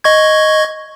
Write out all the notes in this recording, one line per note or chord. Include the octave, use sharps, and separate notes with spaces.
D#5 C#6 G#6